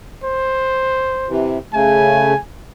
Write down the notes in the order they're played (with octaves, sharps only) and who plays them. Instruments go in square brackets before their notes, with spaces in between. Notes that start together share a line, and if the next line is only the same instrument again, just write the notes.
[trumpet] C5
[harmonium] C3 E3
[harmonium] C#3 A3 [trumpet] G#5